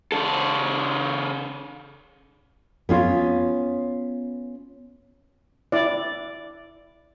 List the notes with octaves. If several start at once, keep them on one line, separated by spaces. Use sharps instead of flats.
C#3 A4
B3 C#4 F4
E4 D5